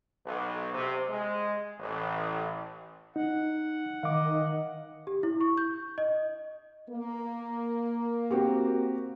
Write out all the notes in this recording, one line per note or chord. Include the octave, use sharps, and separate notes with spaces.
B1
C3
G#3
A1
D#4 F#5
D#3 D#5 F5 D6
G4
E4
C#6
G6
D#5
A#3
C4 F#4 G4